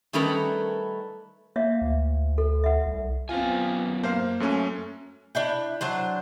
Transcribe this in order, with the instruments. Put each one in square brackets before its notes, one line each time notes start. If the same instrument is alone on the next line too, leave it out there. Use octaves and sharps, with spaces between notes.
[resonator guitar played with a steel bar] D#3 G3 A3 C#4 A#4 B4
[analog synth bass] A#3 [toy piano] C#5 E5 F5
[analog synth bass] D2
[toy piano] A4
E5 F#5
[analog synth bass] C2
[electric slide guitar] F#2 B3 G#5 [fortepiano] C4 F4
[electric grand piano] A#3 [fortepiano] C5 F5
[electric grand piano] F#2 A3 C#4
[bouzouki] D4 E4 G5
F#3 D4 C5